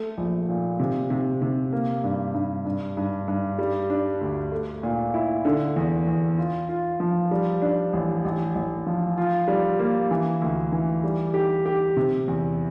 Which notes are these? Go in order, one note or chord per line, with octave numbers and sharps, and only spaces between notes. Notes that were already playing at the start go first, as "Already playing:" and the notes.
Already playing: A3
A#1
A#2
C3
C3
C3
A#3
G2
G2
G2
G2
G2
G3
D4
D2
A3
A#2
E4
D3
E2
E2
F4
F4
F3
G3
D4
A1
A1
A1
F3
F4
G3
A#3
E3
D2
E3
G3
G4
G4
C3
E2